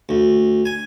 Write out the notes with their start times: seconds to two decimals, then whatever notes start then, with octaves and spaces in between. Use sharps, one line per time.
0.09 D2
0.65 G#5